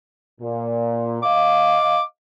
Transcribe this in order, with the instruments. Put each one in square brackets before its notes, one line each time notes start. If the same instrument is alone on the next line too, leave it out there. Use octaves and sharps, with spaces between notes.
[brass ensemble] A#2
[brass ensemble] D#5 F5 [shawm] D6